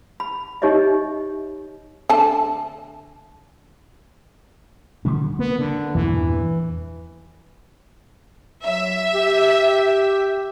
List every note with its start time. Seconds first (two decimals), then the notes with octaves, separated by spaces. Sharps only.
0.20 B5
0.62 D#4 G4 C#5 D#5 E5
2.10 D3 A3 A5
5.05 D3 G3 C#4
5.39 A#3 B3
5.59 D3
5.95 E2 G2 A#2 E3
8.66 F#3 E5
9.14 G4